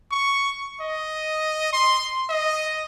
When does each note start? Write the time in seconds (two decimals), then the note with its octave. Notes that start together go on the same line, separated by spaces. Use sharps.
0.11 C#6
0.80 D#5
1.73 C6
2.29 D#5